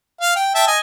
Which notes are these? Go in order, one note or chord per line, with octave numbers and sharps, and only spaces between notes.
F5
G5
E5 G5 A5
D#5 G#5